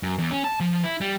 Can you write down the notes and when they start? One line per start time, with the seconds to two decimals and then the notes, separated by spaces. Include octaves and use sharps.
0.03 F#2
0.18 E2
0.31 C#4
0.44 A5
0.60 F3
0.83 E4
1.01 G3